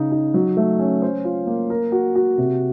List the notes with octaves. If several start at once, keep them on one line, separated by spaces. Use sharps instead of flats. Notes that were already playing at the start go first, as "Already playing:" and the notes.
Already playing: C#3 D#4
D#4
F#3
A3
C#4
C5
F4
A#3
A#4
F#4
F#4
C3